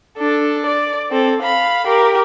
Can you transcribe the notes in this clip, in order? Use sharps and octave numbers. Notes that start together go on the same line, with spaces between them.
D4 A4
D5
C4 A4
F5 B5
G4 A#4